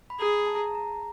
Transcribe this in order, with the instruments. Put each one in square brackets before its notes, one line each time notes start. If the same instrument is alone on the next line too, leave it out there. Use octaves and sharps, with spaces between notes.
[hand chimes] B5
[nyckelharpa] G#4 [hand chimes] A#5
[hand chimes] A5
A#5
A5
A#5